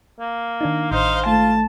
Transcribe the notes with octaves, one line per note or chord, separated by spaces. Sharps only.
A#3
D#3 D4 D#4
A1 D#4 C5 F5
A3 F4 A5